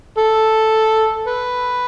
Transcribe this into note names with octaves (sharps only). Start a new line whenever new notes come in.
A4
B4